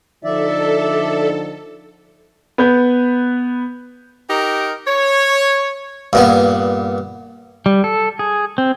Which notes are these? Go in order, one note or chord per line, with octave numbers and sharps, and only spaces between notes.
D3 F3 D#4 A4 D5 E5
B3 B4 G6
D#4 G4 A#4
C#5
G2 A#2 B3
G3
A4
G#4
C4